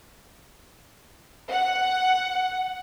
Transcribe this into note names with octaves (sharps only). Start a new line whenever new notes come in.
F#5